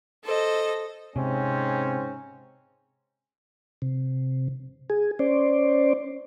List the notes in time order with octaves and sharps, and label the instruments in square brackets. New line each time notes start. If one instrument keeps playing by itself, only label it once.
[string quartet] A4 C5 D#5
[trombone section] G#2 C4 C#4 [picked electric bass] C3
[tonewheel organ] C3
G#4
C#4 C5 D5